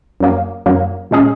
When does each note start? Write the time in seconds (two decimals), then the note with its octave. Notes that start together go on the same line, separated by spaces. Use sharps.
0.20 F#2 F#3 A#3
0.66 F#2 F#3 A#3
1.11 A#2 G#3 C#4 G#4